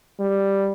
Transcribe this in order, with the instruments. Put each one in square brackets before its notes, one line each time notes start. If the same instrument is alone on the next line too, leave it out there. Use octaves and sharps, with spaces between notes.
[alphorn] G3